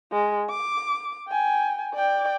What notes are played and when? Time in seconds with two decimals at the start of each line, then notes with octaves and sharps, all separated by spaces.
0.12 G#3
0.50 D6
1.29 G5 G#5
1.95 D5 G5